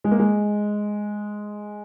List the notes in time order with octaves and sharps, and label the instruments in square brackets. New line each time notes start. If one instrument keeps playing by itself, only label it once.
[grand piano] G#3
A#3
G#3